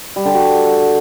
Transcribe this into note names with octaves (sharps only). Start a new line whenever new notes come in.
G3
D3
F#4